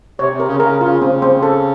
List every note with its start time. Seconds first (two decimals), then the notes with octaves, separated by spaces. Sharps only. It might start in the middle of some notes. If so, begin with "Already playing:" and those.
0.19 C3 C#5
0.33 C3
0.40 A#4
0.47 C#3
0.60 C#3 A#4
0.81 C#3 F4
1.02 C#3 C4
1.22 C4
1.43 A4